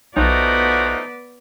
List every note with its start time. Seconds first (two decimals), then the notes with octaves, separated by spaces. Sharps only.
0.17 B1 F3 A3 B3 D#4 F#4 D5